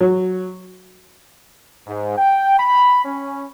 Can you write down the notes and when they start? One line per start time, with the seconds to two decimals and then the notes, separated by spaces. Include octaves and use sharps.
0.01 F#3
1.87 G#2
2.18 G5
2.59 B5
3.05 C#4